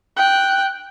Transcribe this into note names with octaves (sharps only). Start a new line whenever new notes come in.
G5 F#6